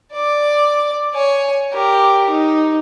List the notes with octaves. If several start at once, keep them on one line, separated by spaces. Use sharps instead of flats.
D5 D6
C#5 G#5
G4 A#4
D#4